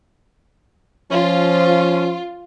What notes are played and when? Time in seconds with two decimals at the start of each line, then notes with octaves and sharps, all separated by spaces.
1.11 F3 C#4 F4